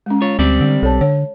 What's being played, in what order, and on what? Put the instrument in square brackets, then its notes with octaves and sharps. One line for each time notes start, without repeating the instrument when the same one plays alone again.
[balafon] G#3 C#4
[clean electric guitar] F4 C#5
[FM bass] D2 [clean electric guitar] G3 C4 D5
[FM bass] D3
[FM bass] B1 [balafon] A4 C#5 A5
[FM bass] D3 [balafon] C#5